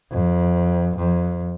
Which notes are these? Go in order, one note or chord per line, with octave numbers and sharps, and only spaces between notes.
F2
F2